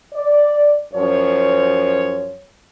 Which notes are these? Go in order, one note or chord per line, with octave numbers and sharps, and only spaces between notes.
D5
F#2 F3 C#5